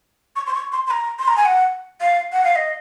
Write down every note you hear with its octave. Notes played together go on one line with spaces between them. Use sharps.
C#6
C6
C#6
C6
C6
A#5
C6
A#5
G#5
F#5
F5
F#5
F5
D#5